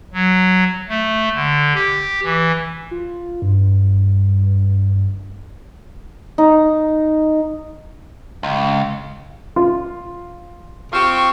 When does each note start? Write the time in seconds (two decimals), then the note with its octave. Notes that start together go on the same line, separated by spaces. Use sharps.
0.13 F#3
0.89 A3
1.35 D3
1.74 G4
2.24 E3
2.91 F4
3.42 G2
6.38 D#4
8.43 C#2
9.56 F4
10.94 C4 F4 G4 C#6